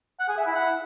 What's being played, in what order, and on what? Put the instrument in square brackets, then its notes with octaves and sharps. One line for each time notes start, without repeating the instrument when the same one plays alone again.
[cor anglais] F#5
G#4
E5
E4
F#5